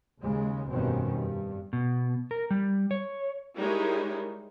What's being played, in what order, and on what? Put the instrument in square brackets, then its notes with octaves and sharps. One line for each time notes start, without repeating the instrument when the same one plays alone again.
[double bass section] D#2 C#3 G#3
F1 G2 B2 D#3 C4 C#4
G2
[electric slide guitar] B2
A#4
G3
C#5
[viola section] G3 G#3 D#4 E4 A#4 C#5